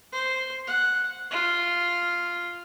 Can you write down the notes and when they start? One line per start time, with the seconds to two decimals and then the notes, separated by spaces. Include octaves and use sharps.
0.12 C5
0.67 F#5
1.31 F4